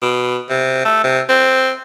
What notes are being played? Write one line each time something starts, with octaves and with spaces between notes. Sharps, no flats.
B2
C3
A3
C3
C4